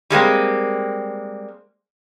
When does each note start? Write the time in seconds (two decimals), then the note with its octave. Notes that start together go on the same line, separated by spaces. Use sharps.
0.10 G3 G#3 A#3 C4